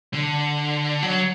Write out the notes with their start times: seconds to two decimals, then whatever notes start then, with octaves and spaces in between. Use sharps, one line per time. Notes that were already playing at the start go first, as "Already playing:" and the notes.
0.14 D3
1.02 F#3